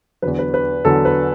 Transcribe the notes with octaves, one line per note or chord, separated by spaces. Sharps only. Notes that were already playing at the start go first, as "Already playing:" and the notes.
E2 D3 F#3 B4
B4
B4
E2 D3 F#3 A4
B4